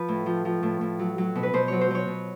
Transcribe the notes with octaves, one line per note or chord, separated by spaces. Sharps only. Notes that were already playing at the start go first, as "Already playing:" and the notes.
Already playing: F3 B4
A2
F3
F3
A2
A2
F#3
F#3
B2
B4
B2 C5
F#3 C#5
C5
F#3 C#5
B2